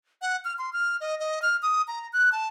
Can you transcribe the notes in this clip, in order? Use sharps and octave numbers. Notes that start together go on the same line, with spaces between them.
F#5
F6
C6
F6
D#5
D#5
F6
D#6
A#5
F#6
A5